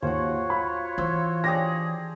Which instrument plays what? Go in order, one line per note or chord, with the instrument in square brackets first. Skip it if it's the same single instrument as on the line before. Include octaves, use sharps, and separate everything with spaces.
[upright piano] D#2 [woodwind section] F4 F#4 C#5 [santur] C5 F#5
[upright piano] B5
[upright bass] E3 [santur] C5 E5 C6
[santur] D4 G4 G#4 [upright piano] A#6